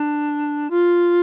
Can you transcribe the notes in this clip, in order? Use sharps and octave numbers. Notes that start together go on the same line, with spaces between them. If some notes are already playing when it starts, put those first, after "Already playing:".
Already playing: D4
F4